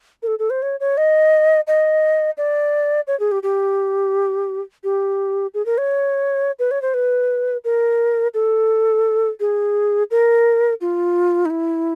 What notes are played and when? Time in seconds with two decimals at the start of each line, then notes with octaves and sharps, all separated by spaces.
0.23 A#4
0.27 A4
0.39 A4
0.50 C5
0.62 C#5
0.80 C#5
0.97 D#5
1.67 D#5
2.38 D5
3.07 C#5
3.20 G#4
3.32 G4
3.43 G4
4.84 G4
5.54 G#4
5.66 A#4
5.78 C#5
6.59 B4
6.71 C#5
6.82 C5
6.94 B4
7.65 A#4
8.34 A4
9.40 G#4
10.11 A#4
10.81 F4
11.45 D#4
11.50 E4